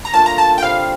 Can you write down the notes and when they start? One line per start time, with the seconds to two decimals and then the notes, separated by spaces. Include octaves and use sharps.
0.05 A#5
0.13 A#2 A3 D4 F4 A5
0.26 A#5
0.38 A5
0.58 G5
0.63 C3 G3 A#3 F5